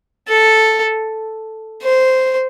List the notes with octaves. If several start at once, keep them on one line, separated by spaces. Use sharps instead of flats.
A4
C5